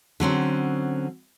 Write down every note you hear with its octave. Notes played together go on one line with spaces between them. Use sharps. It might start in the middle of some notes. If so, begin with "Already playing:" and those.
D3 F#3 C4 C#4